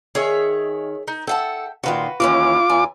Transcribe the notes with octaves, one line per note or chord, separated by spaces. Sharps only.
D#3 G#4 C#5 E5
D#4
A4 E5 F#5 G5 A5
A#2 D#3 F4 F#4 B4
D#2 E3 C#4 F4 D6
E2 G#5